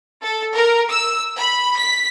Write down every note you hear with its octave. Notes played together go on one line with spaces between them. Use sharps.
A4
A#4
E6
B5
B6